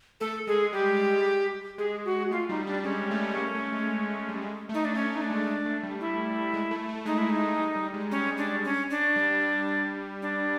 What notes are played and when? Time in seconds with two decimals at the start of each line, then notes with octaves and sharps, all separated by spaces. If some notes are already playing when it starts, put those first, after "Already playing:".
0.20 A3 A4
0.47 G#3 G#4
0.73 G3 G4
1.78 G#3 G#4
2.05 F#4
2.31 A3 F4
2.49 G3 D#4
2.66 G3 D4
2.84 G#3 C#4
3.11 A3
3.37 A#3
3.55 A3
3.72 G#3
3.90 G#3
4.02 A3
4.16 G#3
4.29 G3
4.42 G#3
4.69 A3
4.74 D#4
4.85 D4
4.95 A3 C#4
5.13 A3
5.15 D#4
5.21 D4
5.30 G#3
5.48 G#3
5.66 A3
5.83 G3
6.01 E4
6.54 G#3
6.71 A3
6.89 A3
7.05 G#3 D#4
7.18 E4
7.23 G#3
7.30 D#4
7.41 A3
7.59 G3
7.76 G3
7.94 G#3
8.11 G3 C#4
8.38 D4
8.65 C#4
8.90 D4
9.16 G3
10.22 D4